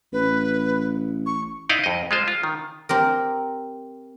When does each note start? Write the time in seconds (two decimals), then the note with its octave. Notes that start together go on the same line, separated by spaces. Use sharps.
0.13 A1 B4
1.26 C#6
1.69 D#4 E4 D5 D#5 F5
1.84 F2 D#5
2.11 G#3 F4 C5
2.28 F4
2.43 D#3
2.89 C4 G4 A#4